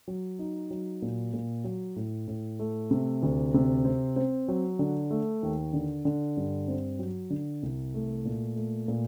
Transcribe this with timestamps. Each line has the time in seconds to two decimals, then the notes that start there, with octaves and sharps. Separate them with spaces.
0.08 F#3
0.39 D#4
0.70 F#3
1.02 A#2
1.33 A#2
1.64 F#3
1.96 A2
2.28 A2
2.59 A3
2.91 C3
3.23 D2
3.54 C3
3.85 C4
4.16 C4
4.48 F#3
4.79 D3
5.11 A3
5.43 D#2
5.73 D3
6.05 D3
6.37 G2
6.68 C4
6.99 F#3
7.30 D3
7.63 C2
7.94 A3
8.25 A#2
8.56 A3
8.88 A#2